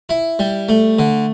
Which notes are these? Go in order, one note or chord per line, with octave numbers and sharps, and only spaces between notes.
E4
G3
A3
D3